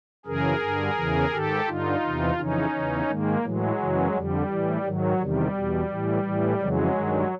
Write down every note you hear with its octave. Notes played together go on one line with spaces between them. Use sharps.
F#2 C#3 E3 G#4 A#4
G2 D3
E2 C#3 E3
G#2 D#3 G4 A4
G2 D3 D#4 F4
E2 C3 E3
F2 C#3 E3 C#4 D#4
E2 C#3 E3
G#2 D#3 G#3 A#3
A2 E3 F#3 G#3
F#2 C#3 E3
F2 D3 G3
A2 E3
G#2 D#3 F#3
E2 C3 D#3 G3
E2 B2
A2 E3
A2 E3
F2 C#3 E3 F#3 G#3
G2 D#3